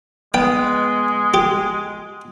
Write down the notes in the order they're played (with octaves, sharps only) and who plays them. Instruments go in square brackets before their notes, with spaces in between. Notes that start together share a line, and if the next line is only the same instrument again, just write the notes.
[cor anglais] G#3 [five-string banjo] B3 [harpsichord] G5
[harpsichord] G4